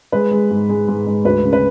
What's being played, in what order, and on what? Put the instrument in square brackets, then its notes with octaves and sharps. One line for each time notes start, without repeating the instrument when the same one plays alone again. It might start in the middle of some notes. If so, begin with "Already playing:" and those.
[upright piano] G#3 B4
G#3
G#2
G#3
G#2
G#3
D2 B4
C#3
B4